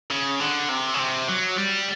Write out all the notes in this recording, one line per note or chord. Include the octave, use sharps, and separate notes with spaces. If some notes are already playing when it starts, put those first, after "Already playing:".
C#3
D3
C3
C#3
C3
F#3
G3